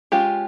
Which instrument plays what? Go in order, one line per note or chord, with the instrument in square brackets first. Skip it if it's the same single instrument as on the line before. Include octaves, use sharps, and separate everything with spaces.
[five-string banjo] G#3 C#4 F4 G4